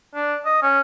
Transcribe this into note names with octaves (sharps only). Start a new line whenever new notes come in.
D4
D#5
C#4